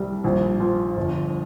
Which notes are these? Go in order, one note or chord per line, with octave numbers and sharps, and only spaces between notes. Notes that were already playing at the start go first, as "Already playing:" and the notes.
Already playing: C2 G3
A#1
F3
G1